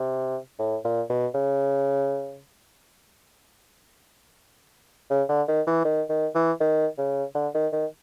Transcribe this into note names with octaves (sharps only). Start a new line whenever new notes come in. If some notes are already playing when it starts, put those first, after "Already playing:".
Already playing: C3
A2
A#2
B2
C#3
C#3
D3
D#3
E3
D#3
D#3
E3
D#3
C#3
D3
D#3
D#3